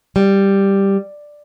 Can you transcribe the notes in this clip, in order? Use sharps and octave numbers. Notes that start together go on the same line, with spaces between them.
G3